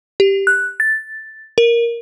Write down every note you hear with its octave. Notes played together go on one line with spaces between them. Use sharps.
G4
F#6
A6
A#4